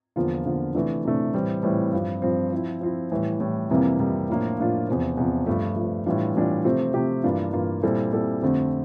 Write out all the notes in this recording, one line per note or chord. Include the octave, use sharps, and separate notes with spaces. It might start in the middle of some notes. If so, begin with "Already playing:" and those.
E2 D3 F3 A#3 F4
E2 D3 F3 A#3 F4
C3 E3 A3 D4
C3 E3 A3 D4
A2 E3 G3 C4
A2 E3 G3 C4
G2 F3 C4
G2 F3 C4
F3 C4 E4
F3 C4 E4
A2 E3 G3
A2 E3 G3
F2 C3 E3 G3 A#3
F2 C3 E3 G3 A#3
A2 F3 A#3 D4 F4
A2 F3 A#3 D4 F4
E2 C3 F3
E2 C3 F3
G2 F3 A3
G2 F3 A3
A2 E3 G3 D4 F4
A2 E3 G3 D4 F4
C3 F3 A3 C4 G4
C3 F3 A3 C4 G4
G2 E3 A#3 D4 F4
G2 E3 A#3 D4 F4
A#2 G3 C4 E4 A4
A#2 G3 C4 E4 A4
F2 D3 A3 C4 G4